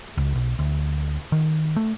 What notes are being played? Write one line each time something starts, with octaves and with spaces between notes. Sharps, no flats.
C#2
B1
D2
D#3
A3